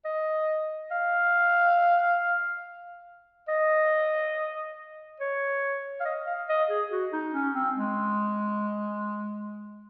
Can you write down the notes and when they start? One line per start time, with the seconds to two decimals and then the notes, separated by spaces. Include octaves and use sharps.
0.05 D#5
0.91 F5
3.49 D#5
5.20 C#5
6.01 F5
6.05 D#5
6.27 F5
6.49 D#5
6.70 G#4
6.91 F#4
7.13 D#4
7.34 C#4
7.55 C4
7.77 G#3